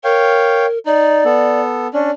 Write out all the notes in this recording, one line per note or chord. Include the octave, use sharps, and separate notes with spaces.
A#4 C#5 F5 G5
D#4 D5
B3 A4
C#4 D4 D5